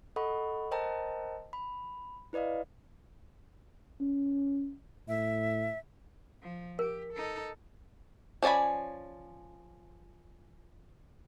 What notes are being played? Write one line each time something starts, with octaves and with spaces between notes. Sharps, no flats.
A4 D#5 F#5 B5 C#6
A#4 C5 D#5 G5 A5 A#5
B5
E4 B4 D5 D#5 F5
C#4
A2 E5
F3
G4 A#4
D#4 A4
F3 C#4 D5 G#5 B5